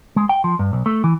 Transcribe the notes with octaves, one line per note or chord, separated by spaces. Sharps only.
G#3
G5
F3
G2
B1
A3
E3